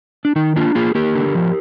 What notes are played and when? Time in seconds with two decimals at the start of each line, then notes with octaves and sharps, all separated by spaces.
0.25 D4
0.36 D#3 D#4
0.56 A#3 D4 F4
0.75 A#3 F4 G#4
0.95 A#3 G4 A#4
1.15 D3
1.35 F3